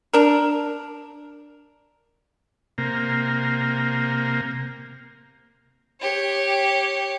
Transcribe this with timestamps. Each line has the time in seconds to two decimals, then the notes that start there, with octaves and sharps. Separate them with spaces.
0.13 D4 A#4
2.78 C3 A#3
6.01 G4 C#5